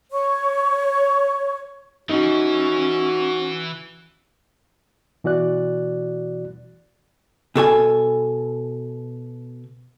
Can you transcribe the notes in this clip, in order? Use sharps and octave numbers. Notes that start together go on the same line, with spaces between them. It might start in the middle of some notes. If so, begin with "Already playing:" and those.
C#5 C#6
E3 C#4 D#4 F#4
B2 E3 F#4 D5 F#6
B2 A4 C#5 G#5